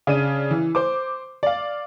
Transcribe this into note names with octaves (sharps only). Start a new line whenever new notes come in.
C#3 D4 D#7
E3
C5 D6
D5 F5